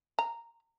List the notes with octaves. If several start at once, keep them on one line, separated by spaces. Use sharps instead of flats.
A#5